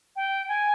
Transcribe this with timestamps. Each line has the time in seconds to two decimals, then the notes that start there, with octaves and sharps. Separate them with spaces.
0.16 G5
0.48 G#5